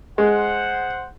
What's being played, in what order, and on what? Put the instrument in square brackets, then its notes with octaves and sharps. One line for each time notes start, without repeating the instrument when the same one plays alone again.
[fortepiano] G#3 [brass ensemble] C5 F#5